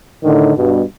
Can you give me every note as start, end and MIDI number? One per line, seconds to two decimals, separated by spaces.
0.24 0.54 45
0.24 0.54 50
0.24 0.54 51
0.57 0.82 43
0.57 0.82 47